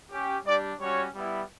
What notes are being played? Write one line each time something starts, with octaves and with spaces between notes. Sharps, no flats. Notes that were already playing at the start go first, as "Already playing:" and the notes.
C#4 G4
G3 D4 G4 D5
G3 C#4 F#4 C#5
G3 B3 E4